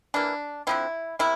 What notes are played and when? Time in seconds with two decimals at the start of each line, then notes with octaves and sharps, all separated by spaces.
0.14 E3 A#3 D4
0.67 D3 F3 C4 E4
1.19 C3 A#3 E4